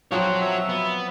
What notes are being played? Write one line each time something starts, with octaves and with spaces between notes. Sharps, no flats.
F3 F#3 C4 F#4 C#5 F#5
E5
B3